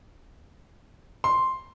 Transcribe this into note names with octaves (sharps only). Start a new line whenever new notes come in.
C6